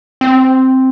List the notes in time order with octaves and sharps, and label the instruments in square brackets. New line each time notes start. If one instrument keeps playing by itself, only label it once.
[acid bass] C4